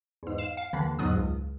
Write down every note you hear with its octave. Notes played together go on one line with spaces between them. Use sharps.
E2 G#2
F5 E7
F5
D#2 D3 E3
E2 G#2 F#3 B3 D#6
C#2